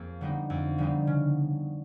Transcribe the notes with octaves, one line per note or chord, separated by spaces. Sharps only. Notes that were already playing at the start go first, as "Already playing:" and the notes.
Already playing: F2 A#3 G#4
D3 G3 B3 D#4
F2
D3 G3 B3 D#4
C#3